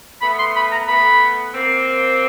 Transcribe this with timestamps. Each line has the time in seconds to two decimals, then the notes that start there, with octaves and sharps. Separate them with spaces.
0.22 A3 B3 B5
0.39 C6
0.56 B5
0.72 A#5
0.88 A3 B3 B5
1.53 A#3 C4